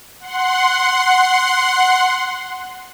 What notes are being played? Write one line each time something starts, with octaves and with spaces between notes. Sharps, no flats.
F#5 C6